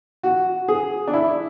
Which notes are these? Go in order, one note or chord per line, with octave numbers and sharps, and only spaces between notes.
F#4
G#4
D4
E4